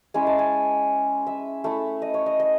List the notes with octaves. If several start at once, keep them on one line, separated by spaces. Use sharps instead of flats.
G#3 C#4 E4 G#5
A5
G#5
E5
A3 E4
D#5
C#5
D#5
D#5